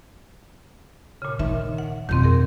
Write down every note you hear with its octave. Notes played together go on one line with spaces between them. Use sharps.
A#2 C#3
D#3 E5
F#5
F2 B2 D#3 C4
G#4 A#4